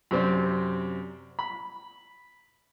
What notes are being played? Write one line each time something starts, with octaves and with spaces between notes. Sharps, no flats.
F#2 C3 C4 D5
B5